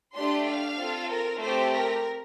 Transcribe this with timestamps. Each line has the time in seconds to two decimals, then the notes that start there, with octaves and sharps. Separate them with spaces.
0.15 A3 D4 G4 C6
0.47 F5
0.78 C4 F4 A4
1.09 A#4
1.40 A3 C4 G4 C5
1.73 A#4